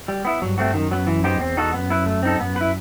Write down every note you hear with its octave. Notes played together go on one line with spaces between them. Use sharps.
G3
B3 E4
G2 F#3
A3 C4 F#4
F#2 D#3
F#3 B3
E3
B3 D#4 G4 C5
E2 C4
D#4 F#4 A4
F#2 B3
E4 B4
A3
C4 D#4 A4
F#2 B3
E4 B4